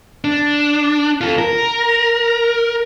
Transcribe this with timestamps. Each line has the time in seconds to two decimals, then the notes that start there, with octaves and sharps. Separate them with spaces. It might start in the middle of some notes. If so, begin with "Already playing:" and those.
0.24 D4
1.21 F4 A4
1.39 A#4